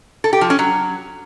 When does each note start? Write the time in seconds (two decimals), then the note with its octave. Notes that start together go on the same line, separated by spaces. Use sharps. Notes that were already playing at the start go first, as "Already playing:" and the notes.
0.24 A4
0.33 G4
0.41 F3
0.50 C#4
0.59 F#3